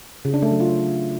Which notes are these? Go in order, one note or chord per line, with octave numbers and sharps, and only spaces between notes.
C#3
D4
A3
F#3
F4